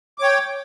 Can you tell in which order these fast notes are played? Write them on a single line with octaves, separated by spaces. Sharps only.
D6 C#5 G5